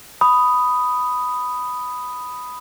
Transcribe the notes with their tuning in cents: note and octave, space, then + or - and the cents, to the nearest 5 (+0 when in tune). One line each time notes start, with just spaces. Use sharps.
B5 +5 D#6 +0